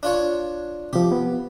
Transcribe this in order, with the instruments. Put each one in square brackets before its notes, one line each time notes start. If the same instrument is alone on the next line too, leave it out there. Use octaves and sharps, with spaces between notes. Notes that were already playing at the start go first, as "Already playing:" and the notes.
[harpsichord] D4 F4 C#5
[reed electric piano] C3 F3 [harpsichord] G4
[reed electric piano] B3